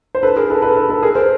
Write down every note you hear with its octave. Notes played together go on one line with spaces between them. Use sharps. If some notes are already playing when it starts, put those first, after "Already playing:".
C5
A4 B4
G#4 A#4
A4 B4
A4 B4
A4 B4
A4 B4
G#4 A#4
A#4 C5